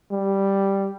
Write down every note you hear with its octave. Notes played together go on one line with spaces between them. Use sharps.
G3